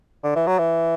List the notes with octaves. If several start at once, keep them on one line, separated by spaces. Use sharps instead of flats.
D3
E3
F#3
E3